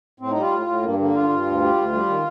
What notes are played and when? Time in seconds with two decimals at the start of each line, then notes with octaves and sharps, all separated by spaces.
0.20 A2 C4
0.31 D#4
0.36 G3 F4
0.52 A2
0.67 A2
0.82 G2 A#3
0.98 D3 A#3
1.14 G2 F4
1.29 G2
1.46 D2
1.61 G3
1.76 D2
1.92 G3
2.08 D#3